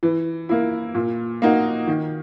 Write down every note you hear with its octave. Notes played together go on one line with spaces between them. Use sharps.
E3
A#3 E4
A#2
A#3 D#4 F#4
D#3